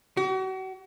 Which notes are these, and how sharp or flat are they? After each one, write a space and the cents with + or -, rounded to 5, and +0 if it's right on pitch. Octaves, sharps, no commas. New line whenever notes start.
F#4 +35